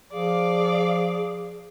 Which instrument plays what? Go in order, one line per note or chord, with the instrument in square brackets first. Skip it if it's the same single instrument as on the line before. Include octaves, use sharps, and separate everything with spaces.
[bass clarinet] F3 [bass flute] G#4 [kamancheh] D5 F5